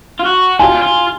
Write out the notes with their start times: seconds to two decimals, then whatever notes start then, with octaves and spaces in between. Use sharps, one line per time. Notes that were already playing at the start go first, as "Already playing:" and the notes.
0.20 F4
0.26 F#4
0.59 F4 G#5
0.82 F4